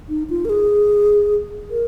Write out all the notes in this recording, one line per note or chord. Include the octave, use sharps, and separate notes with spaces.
D#4
F4
A#4
G#4
A#4